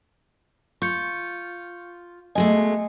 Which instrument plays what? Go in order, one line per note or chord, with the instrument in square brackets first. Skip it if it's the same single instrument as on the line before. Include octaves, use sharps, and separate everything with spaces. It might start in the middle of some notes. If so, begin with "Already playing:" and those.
[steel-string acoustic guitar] F4 [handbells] C#6 G6 C#7
[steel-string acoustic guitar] B2 G#3 A3 [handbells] D#5 G#5